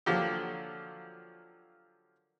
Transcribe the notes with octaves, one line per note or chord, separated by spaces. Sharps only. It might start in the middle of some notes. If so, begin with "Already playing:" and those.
D3 F3 F#3 A#3 G4